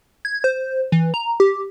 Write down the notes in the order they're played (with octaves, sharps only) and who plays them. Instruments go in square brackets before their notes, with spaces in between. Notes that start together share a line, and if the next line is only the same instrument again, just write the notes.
[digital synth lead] G#6
C5
E3
A#5
G4